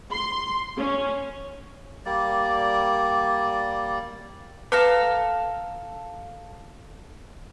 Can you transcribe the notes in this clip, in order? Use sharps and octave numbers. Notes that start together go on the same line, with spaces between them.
C6
C#4
G3 A#3 D5
A4 B4 F5 A#5